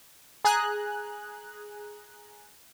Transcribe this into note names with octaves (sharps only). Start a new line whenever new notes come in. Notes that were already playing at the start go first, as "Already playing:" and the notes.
G#4 G#5 A#5 F#6